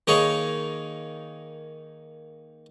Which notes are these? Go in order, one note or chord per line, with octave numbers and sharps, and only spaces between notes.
D#3 A#3 D#4 G#4 C#5